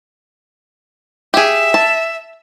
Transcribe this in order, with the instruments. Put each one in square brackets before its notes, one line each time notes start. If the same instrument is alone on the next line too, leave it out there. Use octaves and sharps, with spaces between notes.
[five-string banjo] G4 G#4 [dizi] E5
[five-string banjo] A5